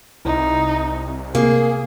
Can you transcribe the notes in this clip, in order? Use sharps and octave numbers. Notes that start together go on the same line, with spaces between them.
C2 D#4 E4
C3 A3 A#3 G#4